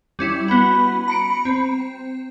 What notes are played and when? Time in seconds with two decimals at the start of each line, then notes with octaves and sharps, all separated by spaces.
0.19 G3 C#4 E4
0.48 B3 F#4 B5
1.08 A#5 C#7 D7
1.45 C4